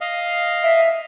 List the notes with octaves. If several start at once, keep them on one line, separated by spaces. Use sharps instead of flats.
D#5 F5
E5